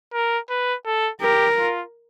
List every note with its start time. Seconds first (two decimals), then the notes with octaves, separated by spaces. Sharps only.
0.14 A#4
0.50 B4
0.86 A4
1.21 G4 A#4
1.57 F4